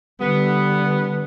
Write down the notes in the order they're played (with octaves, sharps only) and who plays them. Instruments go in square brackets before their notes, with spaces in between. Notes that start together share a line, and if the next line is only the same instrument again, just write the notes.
[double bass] D3 [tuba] G3 [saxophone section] B3